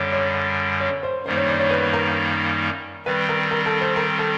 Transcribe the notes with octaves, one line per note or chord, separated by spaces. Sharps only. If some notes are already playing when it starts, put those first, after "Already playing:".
Already playing: F#2 D3 G3 C#5
C#5
C#5
C5
F#2 D#3 G3 A#3 D#4 C5
C#5
D5
C#5
B4
A#4
D#3 G3 C4 B4
A#4
A#4
A4
C5
A#4
A4